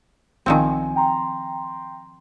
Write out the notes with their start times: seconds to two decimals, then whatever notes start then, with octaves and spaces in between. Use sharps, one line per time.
0.46 B1 D#3 F3 C4 G#5
0.96 G5 A#5 C6